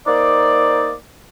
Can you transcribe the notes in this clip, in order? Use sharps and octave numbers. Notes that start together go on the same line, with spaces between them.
A#3 D#4 C5 D5